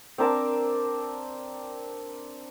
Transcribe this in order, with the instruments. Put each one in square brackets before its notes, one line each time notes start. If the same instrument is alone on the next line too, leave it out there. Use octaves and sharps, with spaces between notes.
[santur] C4 D4 A#4 A5